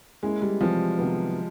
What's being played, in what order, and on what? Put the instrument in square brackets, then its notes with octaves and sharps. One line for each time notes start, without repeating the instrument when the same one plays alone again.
[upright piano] G#3 [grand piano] A#3 C#4 E4 G#4
[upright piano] G3
[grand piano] C3 E3 G3 C4 [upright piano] F3
[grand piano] C3 D#3 F#3 B3